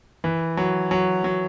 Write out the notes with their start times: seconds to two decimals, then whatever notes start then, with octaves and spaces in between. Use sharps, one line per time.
0.24 E3
0.57 F#3
0.91 F#3
1.24 F#3